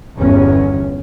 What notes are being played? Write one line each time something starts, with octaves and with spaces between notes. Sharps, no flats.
G1 E2 G2 C#4